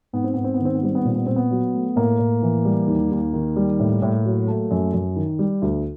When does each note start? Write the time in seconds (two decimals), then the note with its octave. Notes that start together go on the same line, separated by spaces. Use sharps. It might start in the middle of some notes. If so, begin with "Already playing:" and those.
0.13 G#2 B3
0.24 C4
0.34 G#2 B3
0.44 C4
0.54 B3
0.59 D#3
0.65 C4
0.75 B3
0.83 G3 C4
0.95 B3
1.04 A#2 C4
1.16 B3
1.26 A#2 C4
1.36 B3
1.51 F#3
1.74 A3
1.96 A2 A#3
2.19 A2
2.42 E3
2.65 G3
2.87 D#2
3.11 D#2
3.33 D#3
3.56 G3
3.80 A2
4.02 A2
4.25 F#3
4.48 A3
4.71 F#2
4.94 F#2
5.16 D#3
5.39 G3
5.62 D2